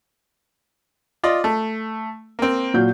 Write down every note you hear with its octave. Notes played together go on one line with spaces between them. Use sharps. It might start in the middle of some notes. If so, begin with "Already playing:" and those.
F4 D5 D#5
A3
A#3 C4
A#2 F#3 G6